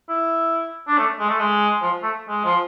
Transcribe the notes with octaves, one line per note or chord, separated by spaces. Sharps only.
E4
D4
A3
G#3
A3
G#3
F3
A3
G#3
F3